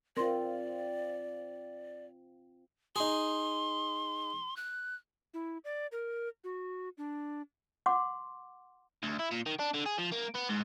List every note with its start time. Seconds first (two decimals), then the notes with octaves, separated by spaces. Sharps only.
0.17 C4 F4 A#4 D5 C6
2.96 D#4 G#4 C6
4.57 F#6
5.34 E4
5.65 D5
5.92 A#4
6.44 F#4
6.98 D4
7.86 F#5 C6 D6
9.03 D2
9.19 E4
9.32 A#2
9.46 D#3
9.59 D4
9.74 D3
9.86 G#4
9.98 F3
10.12 A#3
10.34 B3
10.49 G#2